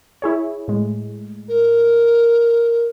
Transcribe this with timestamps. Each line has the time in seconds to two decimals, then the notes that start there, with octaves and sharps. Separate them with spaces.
0.22 E4 G#4 C#5
0.68 A2 G#3
1.48 A#4